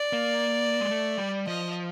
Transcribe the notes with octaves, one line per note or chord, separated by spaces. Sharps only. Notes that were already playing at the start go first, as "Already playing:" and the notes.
Already playing: D5
A#3
G#3
A3
G3
F3 D#5